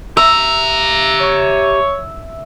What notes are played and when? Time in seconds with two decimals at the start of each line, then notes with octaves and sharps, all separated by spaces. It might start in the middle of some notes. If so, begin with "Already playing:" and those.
0.17 G4 E5 A#5
1.19 C#5